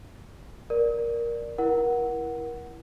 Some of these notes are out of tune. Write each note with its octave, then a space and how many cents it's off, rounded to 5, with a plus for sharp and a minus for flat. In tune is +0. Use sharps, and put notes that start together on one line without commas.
A#4 +10 D5 +5
E4 +10 A#4 +30 F#5 +5